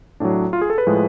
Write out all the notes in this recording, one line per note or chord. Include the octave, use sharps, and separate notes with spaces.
A2 F#3 D4
F4
G#4
A4
B4
A2 F3 G#3